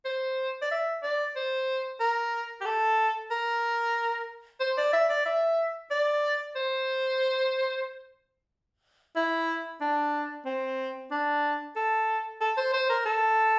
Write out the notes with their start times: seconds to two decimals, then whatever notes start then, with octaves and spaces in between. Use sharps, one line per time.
0.05 C5
0.62 D5
0.71 E5
1.03 D5
1.35 C5
2.00 A#4
2.61 G4
2.66 A4
3.31 A#4
4.60 C5
4.77 D5
4.93 E5
5.09 D5
5.26 E5
5.91 D5
6.56 C5
9.16 E4
9.81 D4
10.45 C4
11.11 D4
11.76 A4
12.41 A4
12.57 C5
12.73 C5
12.89 A#4
13.05 A4